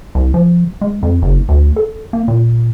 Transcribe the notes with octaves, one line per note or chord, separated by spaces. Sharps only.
C2
F3
G#3
F2
F#1
D2
A4
A#3
A#2